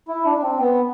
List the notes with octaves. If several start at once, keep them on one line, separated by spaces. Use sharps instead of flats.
E4
D4
D4
C4
B3